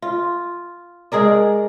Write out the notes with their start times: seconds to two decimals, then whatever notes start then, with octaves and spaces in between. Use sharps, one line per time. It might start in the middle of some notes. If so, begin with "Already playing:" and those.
0.02 F4
1.12 G#3 G#4 A#4 D5